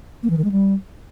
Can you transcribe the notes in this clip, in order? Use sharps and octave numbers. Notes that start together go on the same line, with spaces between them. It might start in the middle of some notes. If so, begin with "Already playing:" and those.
A#3
E3
D#3
G#3
G3